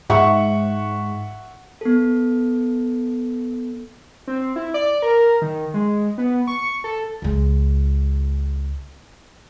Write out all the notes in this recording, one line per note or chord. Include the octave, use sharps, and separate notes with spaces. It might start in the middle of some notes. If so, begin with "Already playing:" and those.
G#2 E5 F#5 C#6
B3 A4
C4
E4
D5
A#4
D#3
G#3
B3
C#6
A4
C#2 G#3